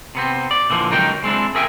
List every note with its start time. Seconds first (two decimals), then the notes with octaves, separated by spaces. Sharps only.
0.15 C3 B3 C4
0.51 D5
0.70 A#2 D3 E3 F3
0.91 C#2 F#3 D#4 A#4 C#5 G5
1.24 G#3 C4 D4 E4
1.55 G#4 A#4 E5 G5 G#5